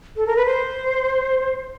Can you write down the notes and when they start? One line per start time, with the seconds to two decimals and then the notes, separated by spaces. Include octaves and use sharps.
0.17 A4
0.27 A#4
0.36 B4
0.46 C5